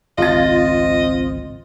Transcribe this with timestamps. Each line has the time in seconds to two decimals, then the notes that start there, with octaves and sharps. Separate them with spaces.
0.18 G#1 C#2 C4 F4 D#5 A6